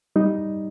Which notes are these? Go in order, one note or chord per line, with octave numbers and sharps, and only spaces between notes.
G3 D#4